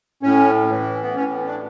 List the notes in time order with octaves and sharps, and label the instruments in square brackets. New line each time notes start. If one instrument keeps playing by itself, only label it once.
[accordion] A2 C#4
E3
B3
A2 C#4
D4